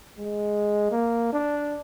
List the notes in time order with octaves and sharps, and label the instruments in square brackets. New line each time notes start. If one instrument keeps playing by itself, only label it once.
[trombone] G#3
A#3
D4